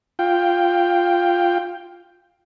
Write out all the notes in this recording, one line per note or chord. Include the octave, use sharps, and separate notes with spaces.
F4 G5